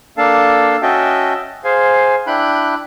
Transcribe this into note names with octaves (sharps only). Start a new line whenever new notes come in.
A#3 D4 A4 F5 A5
C#4 F#4 D#5 E5 G5 A5
G#4 C5 F5 G#5
D4 E4 G5 B5 F#6